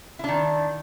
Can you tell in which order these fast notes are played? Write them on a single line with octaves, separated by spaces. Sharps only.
E4 D4 D#3